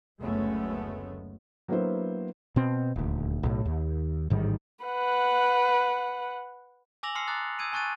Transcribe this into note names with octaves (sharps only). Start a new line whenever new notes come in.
F#1 D2 G#3 A3 B3 C#4
F#3 A#3 B3 D4 E4 C5
B2 C4
D#1 D2
B1 A2
D#2
A1 G#2 D#3 G3
B4 F#5
G#5 D6 E6 A#6 F7 F#7
A5 C6 E6 F6 C7 C#7
A#5 D6 D#6 F#6 A6
D#6 E6 G#6 D7 D#7
G#5 A5 C#6 F#6 A6 D#7